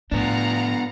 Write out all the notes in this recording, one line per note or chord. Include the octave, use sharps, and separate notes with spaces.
A2 F3 B3 D4 F5 F#5 A#5